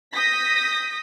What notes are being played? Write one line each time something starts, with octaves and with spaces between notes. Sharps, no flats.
D#6 G6 A#6 B6